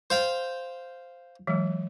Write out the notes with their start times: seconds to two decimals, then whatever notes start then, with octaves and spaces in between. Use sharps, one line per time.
0.10 C5 F5 G5
1.47 E3 F#3 G#3